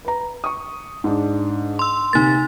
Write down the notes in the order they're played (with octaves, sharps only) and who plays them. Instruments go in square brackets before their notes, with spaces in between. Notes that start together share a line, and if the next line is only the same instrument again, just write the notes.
[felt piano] B4 A#5
C#6 D#6
G#2 D4
[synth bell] C6 E6
[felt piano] C3 A#3 [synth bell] D#4 A6